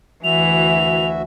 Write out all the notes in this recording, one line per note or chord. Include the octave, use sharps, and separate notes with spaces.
D2 E3 F#4 E5 F7